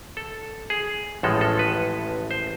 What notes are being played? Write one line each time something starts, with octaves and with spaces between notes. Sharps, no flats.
A4
G#4
A1 A2 F3 G#3 A4
A4
B4
C5